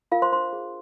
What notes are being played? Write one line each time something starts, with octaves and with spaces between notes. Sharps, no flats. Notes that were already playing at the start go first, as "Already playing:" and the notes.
F4 A#4 F5
C5 C6
D4 C5 C6
G#4 C5